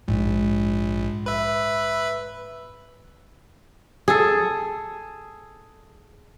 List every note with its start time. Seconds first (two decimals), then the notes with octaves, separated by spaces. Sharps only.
0.08 A#1 G#2
1.26 B4 E5
4.08 G#4 A4